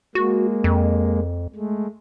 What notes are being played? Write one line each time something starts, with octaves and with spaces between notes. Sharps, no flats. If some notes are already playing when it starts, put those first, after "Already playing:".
G#3 A#3 F#4
F2
G#3 A3